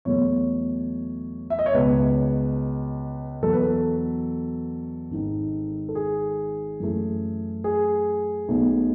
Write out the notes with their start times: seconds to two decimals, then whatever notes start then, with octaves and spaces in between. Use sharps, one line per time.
0.05 E2 B2 F#3 A3 C#5
1.50 E5
1.59 D#5
1.66 C#5
1.74 C#2 B2 G#3 B4
3.42 E2 B2 F#3 A4
3.53 B4
3.63 A4
5.11 G#1 G#2 D#3
5.89 A4
5.95 G#4
6.80 F#2 E3 A3
7.64 G#4
8.48 B1 B2 A3